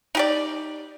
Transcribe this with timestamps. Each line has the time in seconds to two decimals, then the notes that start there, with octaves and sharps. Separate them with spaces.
0.15 D#4 G4 D5